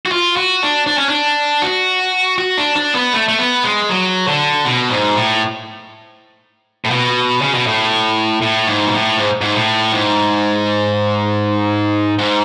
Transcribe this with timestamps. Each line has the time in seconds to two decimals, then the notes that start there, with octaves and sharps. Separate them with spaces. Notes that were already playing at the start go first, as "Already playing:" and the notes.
0.06 F#4
0.12 F4
0.36 F#4
0.63 D4
0.87 D4
0.98 C#4
1.09 D4
1.62 F#4
2.38 F#4
2.57 D4
2.76 D4
2.95 B3
3.13 A3
3.28 A3
3.39 B3
3.64 G#3
3.89 F#3
4.27 D3
4.65 B2
4.89 G#2
5.15 A2
6.85 A2
6.91 B2
7.42 C#3
7.54 B2
7.67 A2
8.42 A2
8.67 G#2
8.86 B2
8.93 A2
9.17 G#2
9.41 G#2
9.56 A2
9.92 G#2
12.18 G#2